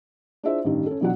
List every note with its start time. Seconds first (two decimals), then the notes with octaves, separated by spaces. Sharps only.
0.43 D4 E4 F4 G#4 C5 E5
0.64 A1 G2 D#3
0.86 C#4 A4
1.01 B1 E3 F#3 D4 F#4 F#5